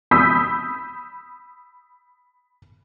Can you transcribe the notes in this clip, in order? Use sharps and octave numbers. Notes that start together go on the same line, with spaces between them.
B5 D#6 E6 G6 B6